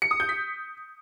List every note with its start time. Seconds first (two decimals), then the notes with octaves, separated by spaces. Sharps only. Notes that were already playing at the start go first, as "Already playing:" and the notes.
0.02 C#7
0.11 D#6
0.20 G6
0.29 B6